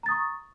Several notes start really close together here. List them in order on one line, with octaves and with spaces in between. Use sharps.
A#5 A6 D#6 C#6